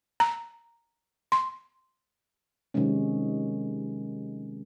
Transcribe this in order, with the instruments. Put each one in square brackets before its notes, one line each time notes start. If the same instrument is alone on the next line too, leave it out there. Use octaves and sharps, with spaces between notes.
[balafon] A#5
C6
[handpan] C3 D#3 F#3 G#3 C#4